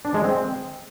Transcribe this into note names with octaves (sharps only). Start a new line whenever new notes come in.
D4
G#3
C4